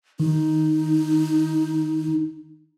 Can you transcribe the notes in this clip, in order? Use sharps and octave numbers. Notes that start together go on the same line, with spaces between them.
D#3 D#4